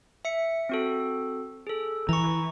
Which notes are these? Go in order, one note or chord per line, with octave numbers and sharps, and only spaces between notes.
E5 C#7
C4 F#4 A4
G#4 A4
E3 A#5 C#6